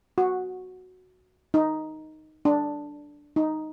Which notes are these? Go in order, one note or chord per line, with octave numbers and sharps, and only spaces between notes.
F#4
D#4
D4
D#4